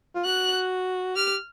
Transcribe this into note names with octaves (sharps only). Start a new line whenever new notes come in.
F4
F#4 F#6
G4 F6